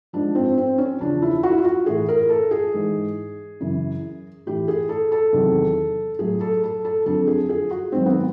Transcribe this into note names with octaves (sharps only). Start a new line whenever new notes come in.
G#2 F3 D4
C4
C4
C#4
E2 C#3 F3 D4
E4
F#4
E4
F4
F#4
A2 E3 G#4
A#4
A4
G#4
G#2 E3
F#2 C#3 E3
A2 E3 G4
G#4
A4
A4
E2 C3 D#3 F#3
A2 F#3 G#4
A4
A4
A4
F2 D3 F#3 A4
G#4
G#4
F#4
G#2 D#3 F#3 C4
B3